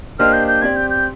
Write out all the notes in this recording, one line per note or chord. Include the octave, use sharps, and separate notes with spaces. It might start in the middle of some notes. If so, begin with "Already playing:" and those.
A#3 D4 G4 C5 D#5 F6
G6
G6
C4 G4 D5 G#6
G6
G6